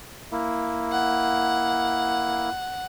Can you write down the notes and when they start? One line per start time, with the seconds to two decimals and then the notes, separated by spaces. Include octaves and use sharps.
0.32 A#3 E4
0.92 F#5